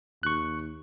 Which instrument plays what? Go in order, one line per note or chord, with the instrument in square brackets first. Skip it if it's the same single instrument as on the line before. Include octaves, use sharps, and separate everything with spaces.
[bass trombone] D#2 [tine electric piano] C#6 F#6